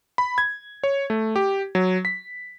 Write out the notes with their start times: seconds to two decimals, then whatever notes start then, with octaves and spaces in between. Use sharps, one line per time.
0.18 B5
0.38 G#6
0.84 C#5
1.10 A3
1.36 G4
1.75 F#3
2.05 B6